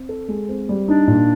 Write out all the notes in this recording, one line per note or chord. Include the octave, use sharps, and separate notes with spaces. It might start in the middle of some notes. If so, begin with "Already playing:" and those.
Already playing: C4
A4
G#3
C4
G3
D4 D#4
A#2